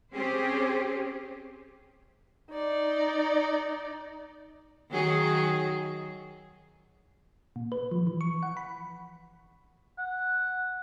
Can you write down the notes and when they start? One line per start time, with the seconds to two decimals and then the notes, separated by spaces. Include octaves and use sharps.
0.12 C4 C#4 G4 G#4 C5
2.50 D#4 D5
4.90 D#3 F#3 G#4
7.56 A#2
7.72 B4
7.91 F3
8.07 E3
8.21 C#6
8.43 F#5
8.57 B5
9.98 F#5